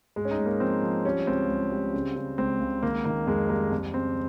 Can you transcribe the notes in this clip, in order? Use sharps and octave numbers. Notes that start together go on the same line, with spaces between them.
G#2 G#3
C#4
D#4
G#2
A#3
F3 C4
F3
G3 C#4
C#2 C4
C#2
G3
C#3
C#3
C#2 C4
C#2
D#3 A#3
D#3 A#3
F2 G#3
G3 A#3
F2
C#3 C4